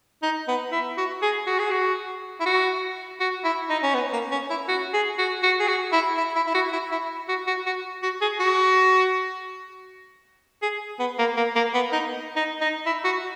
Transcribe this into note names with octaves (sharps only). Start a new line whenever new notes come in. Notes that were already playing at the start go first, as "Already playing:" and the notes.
D#4
B3
E4
F#4
G#4
F#4
G#4
F#4
E4
F#4
F#4
E4
D#4
C#4
B3
A#3
C#4
E4
F#4
G#4
F#4
F#4
G#4
F#4
E4
E4
E4
E4
F#4
E4
E4
F#4
F#4
F#4
F#4
G#4
F#4
G#4
B3
A#3
A#3
A#3
B3
D#4
D#4
D#4
E4
F#4